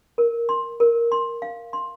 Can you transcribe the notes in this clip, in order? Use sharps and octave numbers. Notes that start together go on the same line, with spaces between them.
A#4
C6
A#4
C6
F5
C6